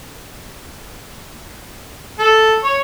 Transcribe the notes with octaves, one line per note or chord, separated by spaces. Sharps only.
A4
C#5